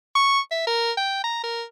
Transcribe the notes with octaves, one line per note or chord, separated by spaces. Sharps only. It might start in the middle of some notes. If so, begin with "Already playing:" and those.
C#6
E5
A#4
G5
A#5
A#4